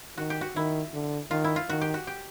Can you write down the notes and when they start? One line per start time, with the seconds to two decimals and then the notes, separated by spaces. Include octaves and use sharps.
0.18 D#3 F#4
0.30 G4
0.41 F#4
0.56 D#3 E4
0.94 D3
1.31 D#3 F4
1.44 E4
1.56 F4
1.69 D#3 F#4
1.81 G4
1.94 F#4
2.07 G4